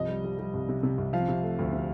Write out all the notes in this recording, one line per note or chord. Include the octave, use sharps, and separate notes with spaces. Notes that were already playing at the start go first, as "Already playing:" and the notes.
Already playing: C2 F3 D#5
G3
G3
G3
C2
C3
C3
C2
F3 F5
C3
A3
D2
C3